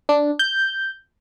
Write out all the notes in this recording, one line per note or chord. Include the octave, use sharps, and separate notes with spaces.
D4
G6